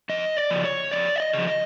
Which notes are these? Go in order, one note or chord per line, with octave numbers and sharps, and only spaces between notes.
F2 D#5
D5
C#3 F3
C#5
F2 D5
E5
D#5
C#3 F3
D#5